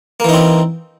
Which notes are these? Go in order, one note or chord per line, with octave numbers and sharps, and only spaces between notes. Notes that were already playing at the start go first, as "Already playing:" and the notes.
E3 A#3 C4 D#4